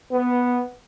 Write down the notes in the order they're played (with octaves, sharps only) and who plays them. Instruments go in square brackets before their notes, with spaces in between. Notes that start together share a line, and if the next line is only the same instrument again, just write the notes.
[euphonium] B3